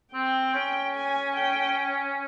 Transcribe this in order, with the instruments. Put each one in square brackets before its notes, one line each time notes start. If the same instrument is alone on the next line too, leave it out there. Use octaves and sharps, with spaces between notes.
[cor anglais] C4 [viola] G5
[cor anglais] C#4
[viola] G#5
G5